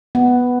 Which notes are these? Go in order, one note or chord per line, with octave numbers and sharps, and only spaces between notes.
B3